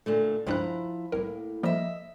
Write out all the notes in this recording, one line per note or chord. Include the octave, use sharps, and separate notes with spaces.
A#2 D3 A3
C#2 G2 F3 E4 A#5 F#6
C2 A2 A#3 A#4
F3 G3 A#3 D#5 E5